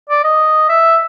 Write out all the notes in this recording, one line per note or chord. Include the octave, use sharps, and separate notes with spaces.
D5
D#5
E5